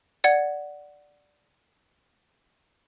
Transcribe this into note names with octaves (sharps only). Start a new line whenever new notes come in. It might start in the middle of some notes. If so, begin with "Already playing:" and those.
D5 F#5 G#6